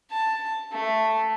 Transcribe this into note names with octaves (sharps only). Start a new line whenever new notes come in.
A5
A3